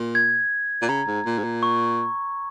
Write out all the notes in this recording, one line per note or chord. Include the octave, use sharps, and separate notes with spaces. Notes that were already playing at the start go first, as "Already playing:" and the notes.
Already playing: A#2
G#6
A#2
C#3 A#5
G#2
A#2
G#2
A#2
C#6